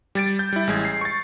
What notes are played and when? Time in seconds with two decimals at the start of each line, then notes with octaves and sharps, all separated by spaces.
0.15 G3 A6 D7
0.39 G6
0.53 G3 E4
0.67 A1 G#3 G#6
0.85 C7
1.01 C#6 A6